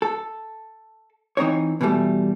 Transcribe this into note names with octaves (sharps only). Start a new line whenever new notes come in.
A4
E3 C4 D#4 C#5
B2 E3 F3 G3 A3